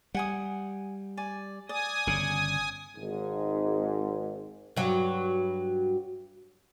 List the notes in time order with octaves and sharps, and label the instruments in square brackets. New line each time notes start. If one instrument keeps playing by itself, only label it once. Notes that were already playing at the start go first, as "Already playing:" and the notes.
[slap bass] G3 [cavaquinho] F#5 G#5 D#6
[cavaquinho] D5 G#5
[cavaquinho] D5 [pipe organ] G#5 D#6
[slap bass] G1 C#3
[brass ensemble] G#1 G#2
[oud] G2 F#3